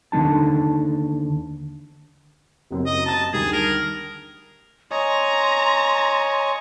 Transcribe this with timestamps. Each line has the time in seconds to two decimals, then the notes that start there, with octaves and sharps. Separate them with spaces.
0.12 D#2 D3 G#3 D#4 A5
2.71 F#1 F#2 C4
2.86 D#5
3.06 A5 A#5 A6
3.33 D2 D#3 G3 G#4
3.53 A#4
4.91 C#5 D#5 G#5 A#5 C6